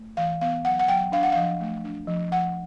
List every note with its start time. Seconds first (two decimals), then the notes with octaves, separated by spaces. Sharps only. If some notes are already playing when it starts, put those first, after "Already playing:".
Already playing: A3
0.17 E3 F5
0.41 B3 F5
0.65 F#3 F#5
0.79 F#5
0.88 F#3 G5
1.12 D4 F5
1.23 F#5
1.32 F3 F5
1.61 A3
1.84 D4
2.07 F3
2.32 F3 F#5